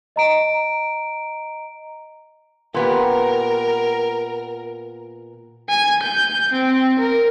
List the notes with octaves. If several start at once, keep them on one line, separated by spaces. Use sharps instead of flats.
D#5 A#5 D7
A#2 B3 G4 A#4
G#5
G6
C4
A#4